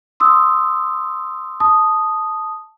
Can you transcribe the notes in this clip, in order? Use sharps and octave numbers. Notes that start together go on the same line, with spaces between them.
C6 D#6 E6
A5 D#6